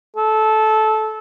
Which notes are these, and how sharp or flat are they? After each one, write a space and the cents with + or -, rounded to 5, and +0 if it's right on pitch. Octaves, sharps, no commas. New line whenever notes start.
A4 -15